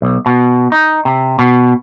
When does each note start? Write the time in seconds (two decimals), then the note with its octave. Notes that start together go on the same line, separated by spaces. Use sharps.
0.02 B1
0.26 B2
0.72 D#4
1.05 C3
1.39 B2